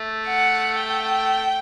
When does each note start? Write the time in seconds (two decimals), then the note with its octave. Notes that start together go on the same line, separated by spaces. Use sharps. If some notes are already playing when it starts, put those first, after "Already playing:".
Already playing: A3
0.27 F#5
0.79 G5